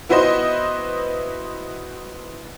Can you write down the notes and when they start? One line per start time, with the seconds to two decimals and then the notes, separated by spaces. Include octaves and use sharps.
0.09 B3 E4 F#4 B4 C5 D#5